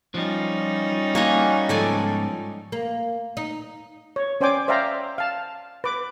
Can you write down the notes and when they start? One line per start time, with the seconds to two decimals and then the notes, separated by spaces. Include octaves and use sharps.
0.14 F3 G3 C#4 D#4
1.15 A#3 F#4 C#5 D#5 G#5
1.69 G#2 F3 A4 D5 G#5
2.72 A#3
3.37 D#4
4.16 C#5
4.41 C#4 C5 D5 G5 G#5 D6
4.68 C5 D5 E5 F5 G5 A#5
5.18 F5 A5
5.84 B4 D6